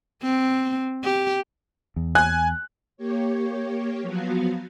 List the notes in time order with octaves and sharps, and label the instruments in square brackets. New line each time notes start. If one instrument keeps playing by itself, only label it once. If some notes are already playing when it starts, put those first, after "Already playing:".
[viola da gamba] C4
G4
[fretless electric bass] E2
[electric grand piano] G#5 [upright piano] F#6
[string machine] A#3 G4 C#5
F3 F#3 B3 F#4 F5